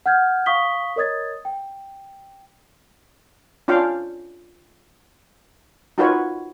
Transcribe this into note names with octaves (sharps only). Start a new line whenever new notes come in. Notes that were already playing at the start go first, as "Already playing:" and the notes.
F#5 F6 G6 G#6
F5 C#6 D#6 B6 G7
A#4 C#5 D#5 D#6 G#6 A6
G5
C#4 D4 F4 F5 G5
D#4 F4 F#4 A#4 B4 C#5